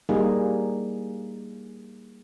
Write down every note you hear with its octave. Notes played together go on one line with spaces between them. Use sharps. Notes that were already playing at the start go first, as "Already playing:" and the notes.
G3 A#3 D#4 G#4